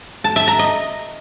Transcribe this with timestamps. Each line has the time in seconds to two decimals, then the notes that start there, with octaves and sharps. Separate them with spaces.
0.24 A5
0.36 E5
0.48 A#5
0.59 D#5